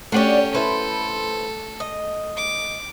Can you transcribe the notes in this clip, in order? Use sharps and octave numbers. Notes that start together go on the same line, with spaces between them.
A3 C#4 D4 F#4 G4 D5 F#5
E4 A4 B4 C5
D#5
D6